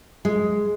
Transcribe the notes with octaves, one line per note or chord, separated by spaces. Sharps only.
G#3